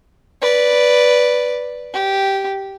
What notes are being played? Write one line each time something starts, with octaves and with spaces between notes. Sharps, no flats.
B4 D5
G4